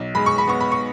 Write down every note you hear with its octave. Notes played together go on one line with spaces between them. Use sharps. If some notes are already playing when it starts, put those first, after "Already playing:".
Already playing: B1
G#3 B5
C#6
B5
B3 C#6
B5
C#6